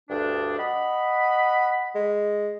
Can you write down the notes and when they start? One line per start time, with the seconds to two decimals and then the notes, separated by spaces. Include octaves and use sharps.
0.09 D2 G2 D4
0.58 D#5 F#5 B5
1.95 G#3